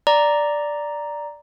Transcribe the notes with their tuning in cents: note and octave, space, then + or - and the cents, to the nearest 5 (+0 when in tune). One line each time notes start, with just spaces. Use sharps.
D5 +0 A#5 +0